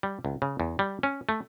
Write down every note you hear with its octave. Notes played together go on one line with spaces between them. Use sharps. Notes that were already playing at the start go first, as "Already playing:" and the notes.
G3
C#2
C#3
E2
G3
C#4
A3